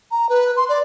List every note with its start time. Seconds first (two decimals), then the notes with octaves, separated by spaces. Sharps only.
0.11 A#5
0.29 B4
0.57 C6
0.69 D5